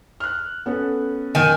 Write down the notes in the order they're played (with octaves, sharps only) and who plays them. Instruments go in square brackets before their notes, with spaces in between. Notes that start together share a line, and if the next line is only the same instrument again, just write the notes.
[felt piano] F6 F#6
B3 C#4 A4
[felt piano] F#2 B2 G5 [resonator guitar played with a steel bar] D#3 G#5